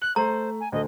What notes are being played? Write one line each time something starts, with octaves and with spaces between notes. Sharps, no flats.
F#6 F#7
A3 C5 A#5
G#5
D2 A4 D#5